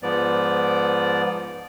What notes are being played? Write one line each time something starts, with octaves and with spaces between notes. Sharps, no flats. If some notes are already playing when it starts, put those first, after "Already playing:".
G#2 F3 B3 D5